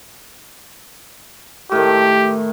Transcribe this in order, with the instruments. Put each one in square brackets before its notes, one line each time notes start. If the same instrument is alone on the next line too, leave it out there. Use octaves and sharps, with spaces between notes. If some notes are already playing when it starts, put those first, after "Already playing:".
[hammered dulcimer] A2 D#3 [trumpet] G4